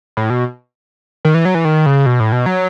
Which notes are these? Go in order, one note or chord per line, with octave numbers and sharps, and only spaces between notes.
A2
B2
D#3
E3
F#3
E3
D#3
C#3
B2
A2
B2
F#3